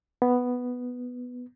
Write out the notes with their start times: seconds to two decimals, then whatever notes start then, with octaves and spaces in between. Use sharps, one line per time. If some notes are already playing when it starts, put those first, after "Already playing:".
0.22 B3